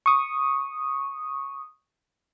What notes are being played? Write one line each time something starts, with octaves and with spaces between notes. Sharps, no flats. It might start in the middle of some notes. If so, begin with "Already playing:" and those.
C#6 D#6